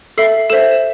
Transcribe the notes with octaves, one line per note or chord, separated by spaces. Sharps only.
A4 E5 C7
A4 C5 E5 E7